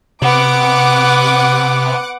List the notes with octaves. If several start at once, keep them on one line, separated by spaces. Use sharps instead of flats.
C3 B3 F#5 D6